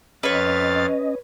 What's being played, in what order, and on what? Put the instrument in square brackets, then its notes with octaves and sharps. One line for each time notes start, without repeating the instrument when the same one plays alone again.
[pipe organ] F2 F5 A6 [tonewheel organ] C#4 D#5 [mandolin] B4 C#5